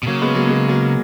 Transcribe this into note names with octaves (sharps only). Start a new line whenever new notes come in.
B2
C#3 F#3 A#3
G#3 B3
F#3 A#3
G#3 B3
F#3 A#3